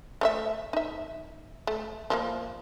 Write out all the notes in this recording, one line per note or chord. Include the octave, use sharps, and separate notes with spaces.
A3 C#5 E5
D#4 E5
A3
F3 A3 A#3